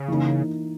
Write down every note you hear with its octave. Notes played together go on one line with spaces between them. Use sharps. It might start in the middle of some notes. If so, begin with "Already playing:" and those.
Already playing: C#3
E3 A#3 D#4